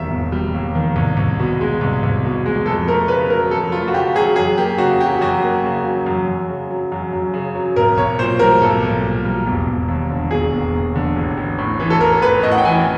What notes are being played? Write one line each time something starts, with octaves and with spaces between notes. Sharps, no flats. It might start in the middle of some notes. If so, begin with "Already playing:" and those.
Already playing: E1 D#2 D#3 G3 E5
E1
G3
D#2
D#3
C2
C2
B2
G#3
C2
C2
B2
G#3
F2 A4
A3 A#4
C#3 B4
F#3 A#4
F2 A4
A3 F4
F#4
C#3 G4
F#3 G#4
F#2 G#4
A#3 G4
C#3 F#4
F#3 G4
F#2 F#4
A#3
C#3
F#3
F#2
F#2
C#3
F#3
F#2
F#2
C#3
F#3
B1 A#4
B1 C#5
A#2 C5
G3 A#4
B1 A4
B1
A#2
G3
E1
E1
D#2
D3
E1 G#4
E1
D#2
D3
A1
A1
A2
E3
A4
A1 A#4
A1 B4
A2 D#5
F#5
G5
E3 G#5